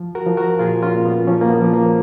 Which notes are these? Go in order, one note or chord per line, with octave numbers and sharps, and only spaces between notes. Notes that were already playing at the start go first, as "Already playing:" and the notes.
Already playing: F3
F#4 A#4
F3
F#4 A#4
A#2 F4 G#4
C#4 F4
A#2
B3
F3 A#3 C#4
A#3
B3
F3
A#3